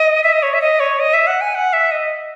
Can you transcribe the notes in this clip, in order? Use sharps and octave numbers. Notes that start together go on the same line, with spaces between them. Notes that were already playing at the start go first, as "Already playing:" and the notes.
Already playing: D#5
E5
D#5
C#5
E5
D#5
C#5
D#5
E5
F#5
G#5
F#5
E5
D#5